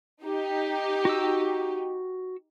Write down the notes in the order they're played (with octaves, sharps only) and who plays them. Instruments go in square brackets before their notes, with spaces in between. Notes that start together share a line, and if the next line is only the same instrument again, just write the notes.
[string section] D#4 G4
[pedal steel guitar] F#4 E6